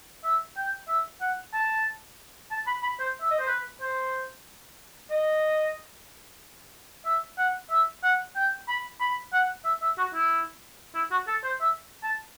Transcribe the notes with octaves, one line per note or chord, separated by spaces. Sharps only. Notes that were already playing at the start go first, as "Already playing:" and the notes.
E5
G5
E5
F#5
A5
A5
B5
B5
C5
E5
D#5
C5
B4
C5
D#5
E5
F#5
E5
F#5
G5
B5
B5
F#5
E5
E5
F#4
E4
E4
F#4
A4
C5
E5
A5